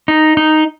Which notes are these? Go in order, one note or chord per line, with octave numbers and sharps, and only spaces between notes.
D#4
D#4